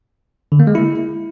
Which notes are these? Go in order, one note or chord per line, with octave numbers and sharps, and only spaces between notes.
D3
A#3
G#3
E4